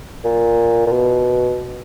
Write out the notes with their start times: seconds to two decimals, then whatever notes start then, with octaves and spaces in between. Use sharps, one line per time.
0.24 A#2
0.86 A#2
0.92 B2